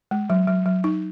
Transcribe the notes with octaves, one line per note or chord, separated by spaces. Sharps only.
G#3
F#3
F#3
F#3
D#4